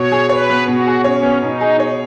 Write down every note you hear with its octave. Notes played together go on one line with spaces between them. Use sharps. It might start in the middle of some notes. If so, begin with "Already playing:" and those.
Already playing: B2 C#5
G#4
B4 C#5
B3
B2 F#4
G#4
C#4 C#5
B3
B2 D#4
G#4
C#5